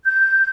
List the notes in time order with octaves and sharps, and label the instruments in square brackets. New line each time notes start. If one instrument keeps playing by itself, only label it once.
[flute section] G6